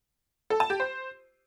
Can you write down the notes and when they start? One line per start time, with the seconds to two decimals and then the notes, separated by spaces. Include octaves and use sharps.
0.50 A4
0.60 A5
0.70 G4
0.80 C5